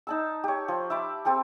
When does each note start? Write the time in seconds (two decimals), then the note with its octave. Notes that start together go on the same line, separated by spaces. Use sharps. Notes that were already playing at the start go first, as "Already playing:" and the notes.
0.07 D#4 A5 E6
0.44 G4 C#5
0.68 F3
0.90 E5 B5 D6
1.25 C4 G4 A4 A5